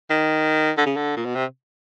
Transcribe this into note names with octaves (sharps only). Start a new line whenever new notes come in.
D#3
D3
C#3
D3
A#2
B2
C3